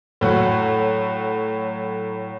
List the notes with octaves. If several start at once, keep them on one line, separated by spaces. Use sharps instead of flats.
A2 F#3 F#4